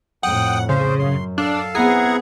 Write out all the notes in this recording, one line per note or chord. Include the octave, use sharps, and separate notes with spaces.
F2 A2 F#5 G5 D#6
C#3 C5
F#2 C6
D4 A4 F5 A5
B3 C4 E4 G#4 F#5 A#5